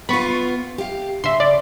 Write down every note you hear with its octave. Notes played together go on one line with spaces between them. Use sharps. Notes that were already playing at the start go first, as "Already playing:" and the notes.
B3 F4 B5 C#6
G4 F5
C#3 E5 C6
D5